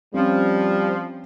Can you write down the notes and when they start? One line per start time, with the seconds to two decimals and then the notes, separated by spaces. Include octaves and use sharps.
0.14 F3 G3 C4 C#4